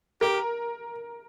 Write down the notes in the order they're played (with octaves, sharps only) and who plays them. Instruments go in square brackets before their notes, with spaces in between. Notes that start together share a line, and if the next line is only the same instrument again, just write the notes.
[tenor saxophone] G4 [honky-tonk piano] A#4